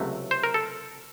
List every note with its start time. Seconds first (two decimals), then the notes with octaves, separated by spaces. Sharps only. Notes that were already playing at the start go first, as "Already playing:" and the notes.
Already playing: C#2 C3 F#3 A3
0.31 C5
0.44 A#4
0.54 A4